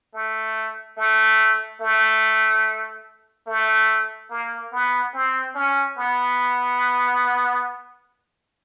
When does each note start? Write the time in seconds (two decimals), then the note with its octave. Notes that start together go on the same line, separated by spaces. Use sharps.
0.14 A3
0.97 A3
1.81 A3
3.47 A3
4.30 A#3
4.72 B3
5.14 C4
5.55 C#4
5.97 B3